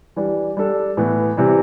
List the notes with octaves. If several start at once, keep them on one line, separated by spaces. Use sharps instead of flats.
E3 G3 D4
G3 D4 A4
A2 E3 B3
C3 E3 G3